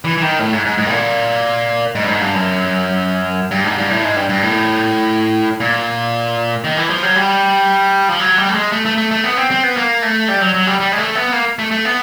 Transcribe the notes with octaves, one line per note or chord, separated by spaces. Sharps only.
E3
E3
D#3
A2
G#2
G#2
G#2
A2
A#2
G#2
G2
G#2
G2
F#2
G2
G#2
G2
A2
G#2
G2
G2
A2
A#2
D#3
E3
F3
F#3
G3
F3
F#3
G3
A3
G#3
A3
A3
A3
A3
B3
C4
C4
B3
A#3
A3
G3
F#3
F#3
G3
G3
G#3
A3
B3
A#3
A3
A3
B3